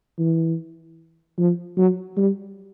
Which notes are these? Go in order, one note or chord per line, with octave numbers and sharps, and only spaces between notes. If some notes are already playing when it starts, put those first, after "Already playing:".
E3
F3
F#3
G3